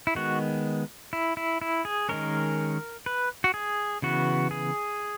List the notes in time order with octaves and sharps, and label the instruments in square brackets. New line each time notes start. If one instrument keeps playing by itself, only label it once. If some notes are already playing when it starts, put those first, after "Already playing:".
[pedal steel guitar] E4
D#3 G#3 B3 F#4
E4
E4
E4
G#4
D#3 G#3 C#4 A#4
B4
F#4
G#4
C#3 E3 B3 F#4
G#4